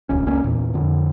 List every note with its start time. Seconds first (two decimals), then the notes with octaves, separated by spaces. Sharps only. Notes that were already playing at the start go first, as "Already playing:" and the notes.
0.09 D#1 C#2 C#4
0.26 C#2 A#3 C#4
0.44 E2 A#2
0.74 F2 D3